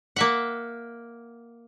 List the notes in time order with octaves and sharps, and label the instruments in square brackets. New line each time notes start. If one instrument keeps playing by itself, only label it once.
[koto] A#3 E5 F#5